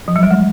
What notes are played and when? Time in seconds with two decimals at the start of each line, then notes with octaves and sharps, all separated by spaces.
0.08 F3
0.16 F#3
0.23 G3
0.31 G#3